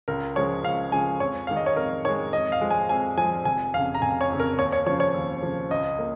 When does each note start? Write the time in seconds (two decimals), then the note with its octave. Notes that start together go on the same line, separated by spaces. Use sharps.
0.08 C#2 A#4
0.36 C#3 F3 G#3 C#5
0.64 C#2 F5
0.92 C#3 F3 G#3 G#5
1.20 F2 C#5
1.47 D#3 G#3 F5
1.57 D#5
1.66 C#5
1.76 F2 A#4
2.05 D#3 G#3 C#5
2.33 F2 D#5
2.52 F5
2.61 F3 G#3
2.70 G#5
2.89 F2 G#5
3.17 F3 G#3 G#5
3.45 F1 G#5
3.74 F2 C#3 F5
3.95 A#5
4.02 F1 G#5
4.21 C#5
4.30 F2 C#3
4.40 A#4
4.58 D#2 C#5
4.72 C#5
4.86 C#3 F3 C#5
5.00 C#5
5.14 D#2
5.43 C#3 F3
5.71 C#2 D#5
5.99 A#3